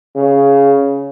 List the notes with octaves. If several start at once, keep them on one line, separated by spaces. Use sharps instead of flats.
C#3